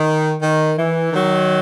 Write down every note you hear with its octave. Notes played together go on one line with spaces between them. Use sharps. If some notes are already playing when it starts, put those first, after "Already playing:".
Already playing: D#3
D#3
E3
D#3 F#3